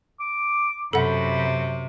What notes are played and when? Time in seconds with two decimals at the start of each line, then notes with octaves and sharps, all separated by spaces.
0.20 D6
0.93 F#2 C3 A4 F#5 B5